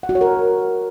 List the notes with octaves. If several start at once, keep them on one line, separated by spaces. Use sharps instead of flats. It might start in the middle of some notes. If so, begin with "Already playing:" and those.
F#5
F#4
C#5
A#4